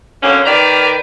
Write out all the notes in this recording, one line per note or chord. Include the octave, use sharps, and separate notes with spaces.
D3 F#3 A#3 C4 C#4
D#3 G4 A#4 B4 D5